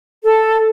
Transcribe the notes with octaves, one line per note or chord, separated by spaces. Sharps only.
A4